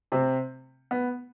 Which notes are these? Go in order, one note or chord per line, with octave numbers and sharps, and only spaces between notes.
C3 C4
B3